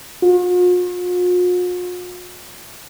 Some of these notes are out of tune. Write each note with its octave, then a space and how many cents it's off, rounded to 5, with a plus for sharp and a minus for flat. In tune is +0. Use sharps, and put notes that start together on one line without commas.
F4 +45